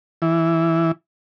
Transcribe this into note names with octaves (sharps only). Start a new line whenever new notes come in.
E3